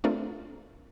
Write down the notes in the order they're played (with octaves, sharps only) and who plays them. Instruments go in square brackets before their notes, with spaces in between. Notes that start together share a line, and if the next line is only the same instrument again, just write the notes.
[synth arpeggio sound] A3 C4 D4 F4 A#4